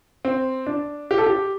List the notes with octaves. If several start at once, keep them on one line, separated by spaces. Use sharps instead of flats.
C4
D4
G4
A4
G4